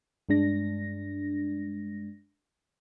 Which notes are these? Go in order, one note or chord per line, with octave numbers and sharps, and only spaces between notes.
G2 G#3 D4 A#6